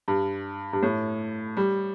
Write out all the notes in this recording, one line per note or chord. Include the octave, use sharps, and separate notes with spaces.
G2
G2
A2
G3